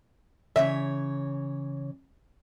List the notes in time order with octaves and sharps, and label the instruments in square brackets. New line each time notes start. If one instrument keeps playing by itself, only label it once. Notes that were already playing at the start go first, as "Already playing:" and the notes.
[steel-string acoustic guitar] C#3 E3 C#5 [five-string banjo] E5